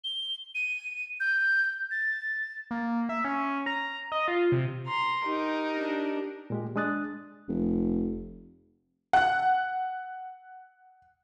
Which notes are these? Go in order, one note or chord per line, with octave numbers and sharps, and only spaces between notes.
G7
D#7
G6
A6
A#3
E5
C#4
A#5
D#5
F4
C3
A#5 C6
D#4 G4 A#4
D4 G4
A#2 G#3 G4
G#3 D4 D#6 F#6 A6
F1
F#5 F#6